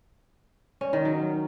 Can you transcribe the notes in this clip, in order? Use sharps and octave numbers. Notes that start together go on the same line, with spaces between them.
C#4
D#3
F#3